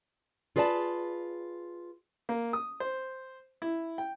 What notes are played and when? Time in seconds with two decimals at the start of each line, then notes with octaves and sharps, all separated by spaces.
0.56 F4 G#4 B4 D5 F5 A5
2.29 A#3
2.53 D#6
2.80 C5
3.62 E4
3.98 G5